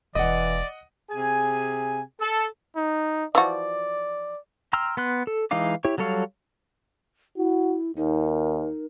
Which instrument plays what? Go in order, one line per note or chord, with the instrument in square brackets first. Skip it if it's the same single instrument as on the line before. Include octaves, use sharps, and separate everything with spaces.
[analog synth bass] E1 [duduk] E3 [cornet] D5 [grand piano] D#5 F#5
[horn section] C3 G#4 G#5
A4
[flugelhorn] D#4
[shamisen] E3 F3 F#4 [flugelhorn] D5
[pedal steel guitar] G5 A#5 C6 E6 F6
B3 C6 F#6
A4
E3 G#3 D#4 F5 D6
E4 G4 C#5
F#3 G3 A4 C#5 F5
[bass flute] E4 [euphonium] F#4
[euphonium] D#2 [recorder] D#4 [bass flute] A#4